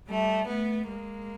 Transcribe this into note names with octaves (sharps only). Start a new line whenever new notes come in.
G3 A3
A3 B3
G#3 A#3